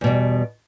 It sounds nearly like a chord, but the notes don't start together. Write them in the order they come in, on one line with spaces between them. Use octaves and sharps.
E2 B2 G3